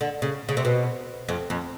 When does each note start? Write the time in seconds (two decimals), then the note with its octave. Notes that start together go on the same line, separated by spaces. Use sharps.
0.01 D3
0.22 C#3
0.49 C#3
0.57 C3
0.65 B2
1.29 F2
1.50 F2